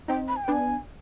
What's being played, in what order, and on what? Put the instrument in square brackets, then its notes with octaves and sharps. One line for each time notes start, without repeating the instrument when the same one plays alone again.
[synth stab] C4 D#4 [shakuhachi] G5
[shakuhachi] B5
G#5
G5
[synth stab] B3 D4 [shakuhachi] G#5